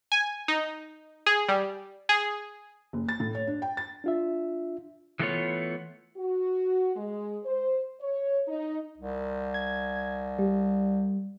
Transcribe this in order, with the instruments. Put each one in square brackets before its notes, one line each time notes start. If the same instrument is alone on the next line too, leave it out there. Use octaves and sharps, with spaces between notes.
[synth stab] G#5
D#4
G#4
G3
G#4
[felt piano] F#1
A6
A2
C#5
D4
G5
A6
[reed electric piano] D4 F4 E5
[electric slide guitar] E3 G#3 A3 B3 F4 C#5
[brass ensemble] F#4
G#3
C5
C#5
D#4
[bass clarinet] C2
[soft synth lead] G#6
G3